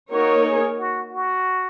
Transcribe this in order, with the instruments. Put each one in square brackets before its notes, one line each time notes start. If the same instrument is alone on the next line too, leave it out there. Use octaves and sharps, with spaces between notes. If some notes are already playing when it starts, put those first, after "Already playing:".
[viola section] A#3 D#4 A#4 C#5 [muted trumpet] F#4
[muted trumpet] G#4
F#4
F#4